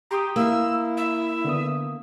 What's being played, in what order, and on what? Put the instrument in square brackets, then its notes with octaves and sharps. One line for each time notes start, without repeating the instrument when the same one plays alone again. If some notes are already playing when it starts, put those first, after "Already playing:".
[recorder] G4 [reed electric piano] A#5 C6 D#6
[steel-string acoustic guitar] A#3 [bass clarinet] E4 [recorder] E6
[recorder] E5
[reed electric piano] D3 B3 D#6